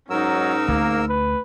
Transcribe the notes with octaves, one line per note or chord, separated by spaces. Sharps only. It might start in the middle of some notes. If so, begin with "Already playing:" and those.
G#2 F#3 C#4 D#4 A#4 E6
D2 A#3
B4